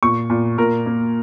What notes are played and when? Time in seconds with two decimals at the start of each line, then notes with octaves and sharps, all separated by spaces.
0.03 A#2 C#6
0.30 A#2
0.58 A#2 A#4
0.86 A#3